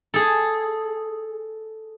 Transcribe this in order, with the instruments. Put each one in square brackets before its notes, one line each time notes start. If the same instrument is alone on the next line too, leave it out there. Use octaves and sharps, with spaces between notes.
[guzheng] G#4 A4